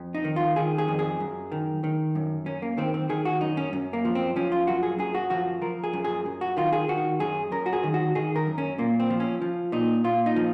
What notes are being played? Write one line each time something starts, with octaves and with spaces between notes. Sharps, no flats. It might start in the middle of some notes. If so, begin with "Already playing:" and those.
Already playing: F2
D#4
D#3
F4
D#3 G#4
G#4
F2
G#4
F#2
D#3
D#3
F#2
F#2 C#4
A#3
D#3 C4
C4
D#3 G#4
F#4
F#2 D#4
C#4
F#2
A#3
F3
C4
F3 C#4
F4
F#2 F#4
G#4
F#2 G#4
F#4
F3 F#4
F3 A#4
G#4
F#2
G#4
F#2
F#4
D#3 F4
G#4
D#3 F#4
F#2 G#4
F#2 A#4
F#4
G#4
D#3
F#4
D#3 G#4
A#4
F#2
C#4
A#2 A#3
C4
F3
C#4
F3
A#2 D#4
A#2 F4
D#4
F3